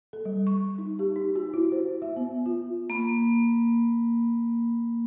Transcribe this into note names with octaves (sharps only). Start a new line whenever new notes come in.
A4
G3
C#6
D#4
G4
D#4
F#4
E4
C5
E5
B3
F4
A#3 B5